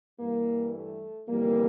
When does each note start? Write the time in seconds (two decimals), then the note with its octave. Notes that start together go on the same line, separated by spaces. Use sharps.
0.19 G2 E3 G3 A#3
0.74 A3
1.27 G1 F2 E3 G3 A#3